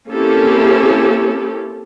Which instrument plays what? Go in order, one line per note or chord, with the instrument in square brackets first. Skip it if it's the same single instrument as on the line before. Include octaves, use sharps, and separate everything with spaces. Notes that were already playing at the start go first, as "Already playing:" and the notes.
[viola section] A#3 C4 C#4 E4 G4 A4